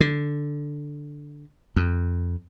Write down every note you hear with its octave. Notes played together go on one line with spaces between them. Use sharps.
D3
F2